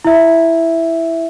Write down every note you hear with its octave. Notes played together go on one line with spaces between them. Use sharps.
E4 E5